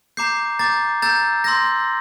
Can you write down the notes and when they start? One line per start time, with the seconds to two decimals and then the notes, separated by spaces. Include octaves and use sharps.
0.17 A#5 D6 G6 C7
0.59 A#5 D6 G6 A6
1.02 A#5 E6 G6 A6
1.44 C6 E6 G6 A#6